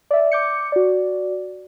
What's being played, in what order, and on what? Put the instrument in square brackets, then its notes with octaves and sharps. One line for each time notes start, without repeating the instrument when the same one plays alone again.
[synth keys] D5 E5
D6 G6 C#7
F#4 D5